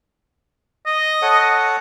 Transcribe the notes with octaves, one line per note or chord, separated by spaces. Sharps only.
D#5
A4 C#5 F#5